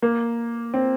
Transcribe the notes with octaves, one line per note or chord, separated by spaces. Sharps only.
A#3
C4